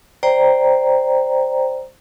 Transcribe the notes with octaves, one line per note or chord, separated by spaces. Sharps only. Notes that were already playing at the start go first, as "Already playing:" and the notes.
C5 D5 G5 A#5